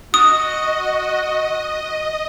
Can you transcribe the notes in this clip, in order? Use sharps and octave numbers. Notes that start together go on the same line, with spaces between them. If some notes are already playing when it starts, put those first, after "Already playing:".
F#4 D#5 D#6